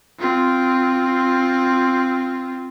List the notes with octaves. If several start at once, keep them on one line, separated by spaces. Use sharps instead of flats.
C4 F4